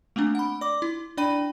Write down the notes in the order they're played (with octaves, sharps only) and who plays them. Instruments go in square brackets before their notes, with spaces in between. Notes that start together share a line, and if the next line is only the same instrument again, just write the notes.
[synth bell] A3 A#3 C4 D4
F#5 B5
D5 D6
E4
D4 D5 G5 B5 D#7